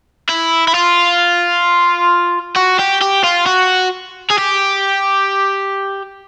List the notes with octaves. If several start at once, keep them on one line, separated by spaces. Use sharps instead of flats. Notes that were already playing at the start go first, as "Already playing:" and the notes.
E4
E4
F4
F#4
G4
G4
F4
F#4
G#4
G4